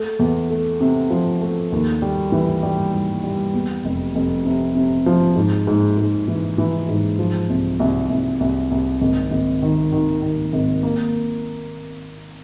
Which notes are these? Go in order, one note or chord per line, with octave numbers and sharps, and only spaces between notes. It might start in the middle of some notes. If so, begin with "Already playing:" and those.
Already playing: A3
E2
A3
C3
F3
A3
D#2
G3
E3
G3
G3
G3
E2
F1
F1
C3
C3
F3
G#2
G#2
G#2
E3
E3
G#2
F3
C2
C2
C2
C2
C2
G#1
G#1
D#3
D#3
D#3
G#1
A#3